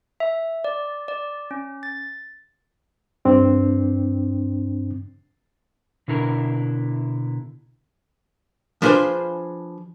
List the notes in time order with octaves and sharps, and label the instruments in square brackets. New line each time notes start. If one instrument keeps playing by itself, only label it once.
[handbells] E5
D5
D5
C#4
A6
[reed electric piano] G2 C4 D4
[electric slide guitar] B2 D3 E4 A#4
[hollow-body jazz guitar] F3 D4 F4 G#4 B4 C5